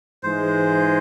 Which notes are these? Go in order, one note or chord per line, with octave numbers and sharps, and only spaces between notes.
G#2 E3 G#3 C5